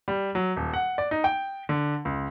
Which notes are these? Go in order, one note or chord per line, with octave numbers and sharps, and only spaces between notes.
G3
F#3
D#1
F#5
D5
D#4
G5
D3
C#2